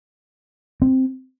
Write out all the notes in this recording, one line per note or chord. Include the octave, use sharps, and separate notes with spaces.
C4